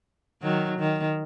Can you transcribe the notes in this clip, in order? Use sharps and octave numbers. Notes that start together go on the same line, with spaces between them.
D#3 F#3
D#3